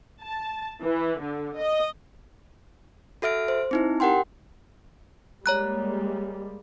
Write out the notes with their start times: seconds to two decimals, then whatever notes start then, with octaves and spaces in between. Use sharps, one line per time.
0.19 A5
0.82 E3
1.20 D3
1.57 D#5
3.22 F#4 A4 E5 F6 D7
3.48 C5
3.71 C4 D#4 E4
4.00 G4 A#4 F#5 G5 C6
5.46 G3 G#3 A#3 C#5 A#5 F#6